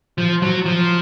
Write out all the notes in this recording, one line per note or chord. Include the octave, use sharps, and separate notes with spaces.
F3
F#3
F3